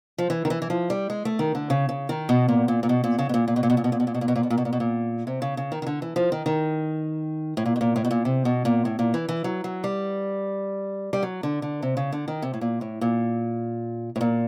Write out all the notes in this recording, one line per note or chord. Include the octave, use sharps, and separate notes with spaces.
F3
E3
D#3
E3
E3
F3
G3
G#3
A3
D#3
D3
C#3
C#3
D#3
B2
A#2
A#2
A#2
B2
A#2
C#3
B2
A#2
A#2
B2
A#2
B2
A#2
B2
A#2
B2
A#2
B2
A#2
B2
A#2
B2
A#2
B2
A#2
B2
A#2
C3
C#3
C#3
D#3
D#3
D3
E3
F3
D#3
D#3
A2
A#2
B2
A#2
A2
B2
A#2
C3
B2
A#2
A2
A#2
E3
E3
F#3
F#3
G3
G3
F#3
D3
D3
C3
C#3
D3
D#3
C3
A2
A#2
A2
A#2
A2
A#2